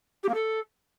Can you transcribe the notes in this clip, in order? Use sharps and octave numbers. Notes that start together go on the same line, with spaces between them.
G4
A#3
A4